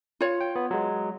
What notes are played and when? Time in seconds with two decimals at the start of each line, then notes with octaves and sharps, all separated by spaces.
0.21 F4 C#5
0.41 G5
0.56 B3
0.71 F#3 G#3